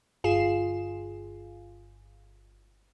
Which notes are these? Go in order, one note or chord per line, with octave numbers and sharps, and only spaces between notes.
G1 F4 G#4 C7 E7